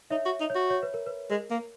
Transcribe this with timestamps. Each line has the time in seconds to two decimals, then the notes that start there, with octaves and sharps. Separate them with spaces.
0.10 D#4 C#5 E5
0.25 F#4
0.40 D#4
0.50 C#5
0.55 F#4
0.70 C#5
0.83 B4
0.94 A#4
1.06 B4
1.30 G#3 A#4
1.50 A#3